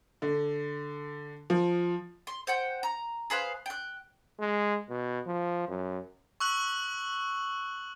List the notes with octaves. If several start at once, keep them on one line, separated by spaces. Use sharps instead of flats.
D3
F3
C6
C5 F#5 G5
A#5
G#4 B4 C5 F5
G5 F#6
G#3
B2
F3
F#2
C#6 E6 F#6 F#7